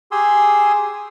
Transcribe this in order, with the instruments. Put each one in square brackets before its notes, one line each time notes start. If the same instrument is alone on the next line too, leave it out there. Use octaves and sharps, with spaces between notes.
[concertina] G4 G#4 G#5 C6 D#6 E6